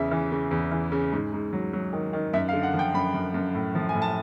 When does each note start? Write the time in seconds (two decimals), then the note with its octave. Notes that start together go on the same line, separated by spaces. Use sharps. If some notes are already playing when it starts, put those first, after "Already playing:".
Already playing: E2 C#3 E5
0.11 E3
0.32 C#3
0.51 E2
0.71 E3
0.92 C#3
1.12 G#2
1.33 G#2
1.53 F#3
1.73 F#3
1.93 D#3
2.13 D#3
2.33 F#2 E5
2.49 F5
2.53 D3
2.63 F#5
2.74 F3
2.79 G5
2.94 F#2 B5
3.14 F#2
3.34 F#2
3.55 A2
3.75 F3
3.89 G#5
3.95 A2
4.02 A5